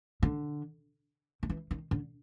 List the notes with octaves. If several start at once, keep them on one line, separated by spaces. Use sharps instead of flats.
D3
D#3
E3
D#3
D3